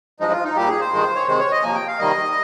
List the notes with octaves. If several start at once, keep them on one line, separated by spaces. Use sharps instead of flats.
G2 F3 G#3 D#4
F4
D#4
A#2 G3 A#3 G4
G#4
C5
G2 D#3 G#3
C#5
C3 D#3 G#3 C5
C#5
D#5
C3 F3 A#3 G#5
G5
F5
C3 D#3 G3 A#3 D#5